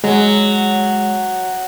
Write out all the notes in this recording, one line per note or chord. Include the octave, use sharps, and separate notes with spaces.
F#3 G#3